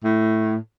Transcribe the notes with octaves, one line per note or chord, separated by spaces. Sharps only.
A2